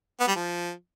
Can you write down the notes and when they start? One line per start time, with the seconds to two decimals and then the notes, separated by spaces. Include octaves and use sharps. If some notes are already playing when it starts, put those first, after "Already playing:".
0.20 B3
0.28 G3
0.36 F3